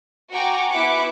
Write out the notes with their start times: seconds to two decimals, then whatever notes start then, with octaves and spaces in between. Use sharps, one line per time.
0.31 F#4 G5 G#5 A#5 C#6 D6
0.70 B3 E4 E5 D6 F#6 C#7